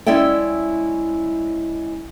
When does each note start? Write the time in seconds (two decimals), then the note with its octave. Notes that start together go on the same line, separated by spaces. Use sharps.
0.06 G#3 C#4 E4 D5 E5 G5